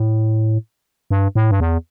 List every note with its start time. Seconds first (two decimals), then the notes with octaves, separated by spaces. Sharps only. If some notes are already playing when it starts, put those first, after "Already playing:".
Already playing: A2
1.11 G2
1.35 A2
1.51 G2
1.60 E2